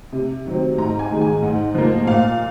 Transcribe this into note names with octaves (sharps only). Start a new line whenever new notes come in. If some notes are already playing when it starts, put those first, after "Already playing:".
C3
D#3 F#3 C4
G#2 A#5
G#5
D#3 G#3
G#5
G#2 F#5
F3 A#3
A#2 F5